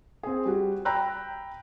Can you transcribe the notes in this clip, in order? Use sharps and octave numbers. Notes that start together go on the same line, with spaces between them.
C4 G#4
G3 F#4
G5 A#5 B5 E6 F#6